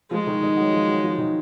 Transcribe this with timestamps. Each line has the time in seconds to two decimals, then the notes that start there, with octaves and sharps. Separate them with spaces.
0.11 F3 G#3 F4
0.27 D#3 D#4
0.41 D#3 D#4
0.57 F#3 F#4
0.72 F3 F4
0.88 F#3 F#4
1.04 F3 F4
1.18 D#3 D#4